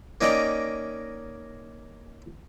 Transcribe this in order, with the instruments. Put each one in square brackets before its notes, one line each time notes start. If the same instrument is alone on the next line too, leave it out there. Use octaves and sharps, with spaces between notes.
[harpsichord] A#3 C#4 D#4 D5 G5 A#5